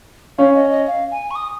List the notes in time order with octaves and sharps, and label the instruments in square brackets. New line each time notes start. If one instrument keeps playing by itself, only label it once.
[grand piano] C#4 [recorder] F5
[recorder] D#5
D#5
F5
G#5
C#6
D#6